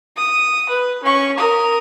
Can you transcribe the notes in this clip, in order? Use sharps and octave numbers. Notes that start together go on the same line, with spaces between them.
D#6
B4
C#4 C#6
A#4 D#6